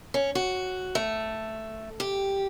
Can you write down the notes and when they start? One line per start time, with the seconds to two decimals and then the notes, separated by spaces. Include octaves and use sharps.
0.14 C#4
0.35 F#4
0.95 A3
2.00 G4